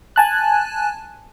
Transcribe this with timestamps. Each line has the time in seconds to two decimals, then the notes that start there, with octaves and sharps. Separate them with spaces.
0.16 G#5 A5 F#6